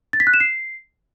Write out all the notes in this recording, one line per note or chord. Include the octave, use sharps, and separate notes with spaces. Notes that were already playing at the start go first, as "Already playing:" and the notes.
A6
B6
F#6
E7
C7